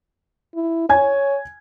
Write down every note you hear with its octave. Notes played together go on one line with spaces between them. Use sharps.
E4
C#5 G#5 G#6